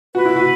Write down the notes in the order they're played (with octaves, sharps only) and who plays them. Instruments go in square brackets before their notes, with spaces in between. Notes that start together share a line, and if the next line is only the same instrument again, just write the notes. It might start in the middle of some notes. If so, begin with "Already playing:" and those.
[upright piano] F#4 [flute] B4
[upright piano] E4
F#4